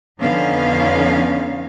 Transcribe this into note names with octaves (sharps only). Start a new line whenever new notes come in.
F2 D3 B3 C#4 D#4 F5